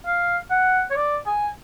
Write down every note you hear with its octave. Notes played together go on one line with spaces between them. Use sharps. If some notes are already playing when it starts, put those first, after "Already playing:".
F5
F#5
C#5
D5
G#5